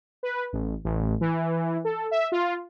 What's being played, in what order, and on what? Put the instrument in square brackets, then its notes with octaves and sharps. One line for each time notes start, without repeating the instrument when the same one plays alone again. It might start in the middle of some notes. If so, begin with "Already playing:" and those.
[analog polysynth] B4
A1
A1
E3
A4
E5
F4